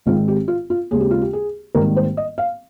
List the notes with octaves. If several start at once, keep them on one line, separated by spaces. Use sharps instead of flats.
G#1 G#2 D#3 G#3 C4 F4
G4
F4
F4
D#2 C#3 G#3 C4 G#4
G4
F4
G4
G#4
G#1 G#2 D#3 G3 A#3 A#4
C5
D#5
F5